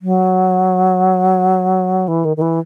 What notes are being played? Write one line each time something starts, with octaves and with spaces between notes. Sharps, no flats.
F#3
E3
D#3
D#3
E3